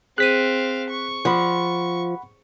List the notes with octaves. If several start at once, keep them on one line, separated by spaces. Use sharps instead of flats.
C4 G#4 C5 F5 F#6 B6 D#7
C#6
F3 F#5 B5